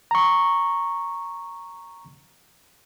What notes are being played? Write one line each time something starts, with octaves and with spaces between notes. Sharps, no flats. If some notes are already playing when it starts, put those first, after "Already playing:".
A#5 C#6